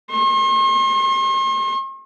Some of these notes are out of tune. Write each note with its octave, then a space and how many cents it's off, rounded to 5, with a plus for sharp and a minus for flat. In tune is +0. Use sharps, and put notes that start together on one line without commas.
C6 +45